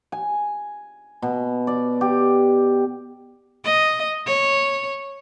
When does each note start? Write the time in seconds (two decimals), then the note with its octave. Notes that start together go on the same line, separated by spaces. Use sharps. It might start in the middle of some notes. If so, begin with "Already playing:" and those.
0.12 G#5
1.22 B2
1.67 D5
2.01 G4
3.64 D#5
4.27 C#5